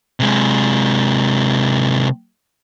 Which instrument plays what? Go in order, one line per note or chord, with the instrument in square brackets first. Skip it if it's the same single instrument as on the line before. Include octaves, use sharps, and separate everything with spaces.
[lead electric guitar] C3 G#3